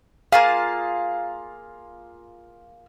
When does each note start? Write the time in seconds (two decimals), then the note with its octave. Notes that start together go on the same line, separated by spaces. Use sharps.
0.32 A#3 F4 G#4 F5